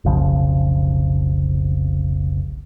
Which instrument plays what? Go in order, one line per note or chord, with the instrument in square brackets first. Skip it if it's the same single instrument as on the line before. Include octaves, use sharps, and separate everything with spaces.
[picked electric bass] F1 B1 C#3 F3